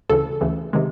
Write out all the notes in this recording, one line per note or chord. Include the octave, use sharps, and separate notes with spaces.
D2 C#3 E3 A4
D2 C#3 E3
C3 D#3 G#3